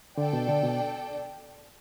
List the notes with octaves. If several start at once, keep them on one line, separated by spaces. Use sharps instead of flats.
D3 D4 A4 D5 G5
B2
D3
B2